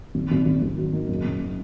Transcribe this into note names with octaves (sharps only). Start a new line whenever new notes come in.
G#1
G#1
G#1
G#1
F#3
D#3
F#1
C#3